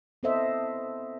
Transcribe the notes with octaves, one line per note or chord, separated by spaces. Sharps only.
B3 C4 A4 C5 D#5 E5